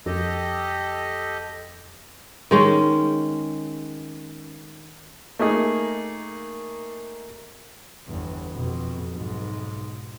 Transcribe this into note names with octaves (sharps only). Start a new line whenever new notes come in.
F2 G4 A4 D#5
D#3 G#3 C#4
A3 A#3 D#4 G#4
G1 E2
F2 B2
B1 G#2